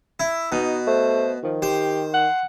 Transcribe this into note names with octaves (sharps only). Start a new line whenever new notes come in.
E4
B2 D#4
A3 C5
D#3 F3
G4 C5
F#5